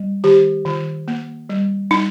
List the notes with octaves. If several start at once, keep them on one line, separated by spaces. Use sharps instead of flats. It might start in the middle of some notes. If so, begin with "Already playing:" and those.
Already playing: G3
D#3 G4
D#3
A#3
G3
G3 D#4